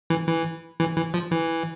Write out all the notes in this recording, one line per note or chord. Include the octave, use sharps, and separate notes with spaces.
E3
E3
E3
E3
F3
E3